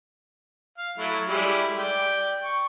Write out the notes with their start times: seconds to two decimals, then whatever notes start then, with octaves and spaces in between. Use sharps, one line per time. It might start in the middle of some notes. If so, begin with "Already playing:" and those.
0.78 F5
0.98 F#3 A3 E4
1.28 G3 G#3 E4
1.78 D5 G5
2.43 C#6